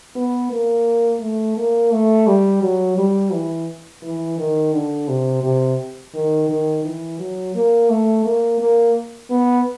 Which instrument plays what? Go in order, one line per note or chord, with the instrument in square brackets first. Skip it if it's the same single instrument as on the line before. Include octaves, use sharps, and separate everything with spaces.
[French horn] B3
A#3
A3
A#3
A3
G3
F#3
G3
E3
E3
D#3
D3
C3
C3
D#3
D#3
E3
F#3
A#3
A3
A#3
A#3
B3